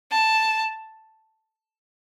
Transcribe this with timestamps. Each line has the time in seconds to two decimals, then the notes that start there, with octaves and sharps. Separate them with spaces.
0.11 A5